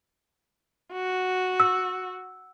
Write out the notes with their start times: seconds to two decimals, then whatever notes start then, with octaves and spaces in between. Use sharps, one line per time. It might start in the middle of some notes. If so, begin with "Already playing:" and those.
0.93 F#4
1.60 E6